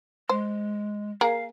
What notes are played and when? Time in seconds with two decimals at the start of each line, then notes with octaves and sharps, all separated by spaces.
0.29 G#3 C5
1.21 A#3 G#4 A#4 F5